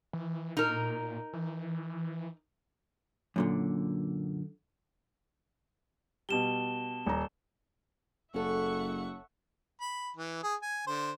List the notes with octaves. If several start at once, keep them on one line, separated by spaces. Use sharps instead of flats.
E3
A#2 D#4 A#4
E3
F#2 A#2 D3
B2 G3 A5 E7 G7
D#1 A#5
F#1 C#4 A4 E5 F#5 C#6
B5
E3
G#4 D#6
G#5
D3 C5